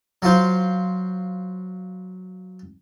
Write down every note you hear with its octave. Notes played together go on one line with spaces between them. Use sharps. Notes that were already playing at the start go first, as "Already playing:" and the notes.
F#3 F4 C5